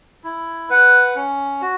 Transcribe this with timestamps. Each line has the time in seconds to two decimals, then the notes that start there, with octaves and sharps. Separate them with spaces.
0.24 E4
0.70 B4 F#5
1.16 C#4
1.62 F#4